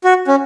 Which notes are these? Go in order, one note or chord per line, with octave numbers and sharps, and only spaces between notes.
F#4
C#4